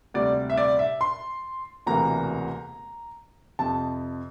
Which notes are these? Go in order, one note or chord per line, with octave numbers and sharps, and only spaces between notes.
D2 C3 G3 D5
E5
D5
E5
C6
E1 D2 C3 E3 A#3 A#5
F2 C3 F3 A5